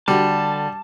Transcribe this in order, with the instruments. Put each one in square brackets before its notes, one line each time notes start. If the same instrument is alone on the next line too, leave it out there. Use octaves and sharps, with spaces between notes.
[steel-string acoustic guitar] D3 F#4 A4 [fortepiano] G3 [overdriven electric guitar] A5